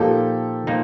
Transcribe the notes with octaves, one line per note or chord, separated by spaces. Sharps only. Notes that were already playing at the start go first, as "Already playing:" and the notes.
Already playing: A#2 F3 A#3 D#4 G4 A4
A#2 F3 A#3 D#4